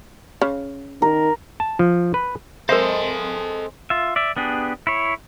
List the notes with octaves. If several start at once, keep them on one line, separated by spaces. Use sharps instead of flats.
C#3
D#3 A#4
A5
F3
B4
G#3 C4 A4 A#4 C5 D#5 E5
F4 E5
D5 E5
B3 D4 G4 G#4
E4 C#5